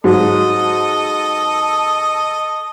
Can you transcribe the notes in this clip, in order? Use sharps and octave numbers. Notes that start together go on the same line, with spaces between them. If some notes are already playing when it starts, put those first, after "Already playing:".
G#2 F#3 A4 D#5